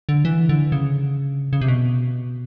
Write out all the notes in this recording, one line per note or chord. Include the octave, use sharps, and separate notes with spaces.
D3
E3
D3
C#3
C#3
C3
B2